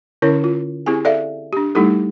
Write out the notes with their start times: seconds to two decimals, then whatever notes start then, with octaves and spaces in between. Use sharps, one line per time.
0.22 D3 C#4 E4 A#4 C#5
0.44 F4
0.86 C4 E4 G4 G#4 G#5
1.05 A4 D5 E5 F5
1.53 D4 G4
1.75 G3 A3 D#4 E4 G4 A4